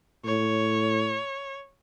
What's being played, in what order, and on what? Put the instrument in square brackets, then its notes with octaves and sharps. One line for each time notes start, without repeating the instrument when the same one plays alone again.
[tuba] A2 [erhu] C#5